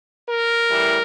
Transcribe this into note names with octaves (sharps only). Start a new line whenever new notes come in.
A#4
A2 E3 G3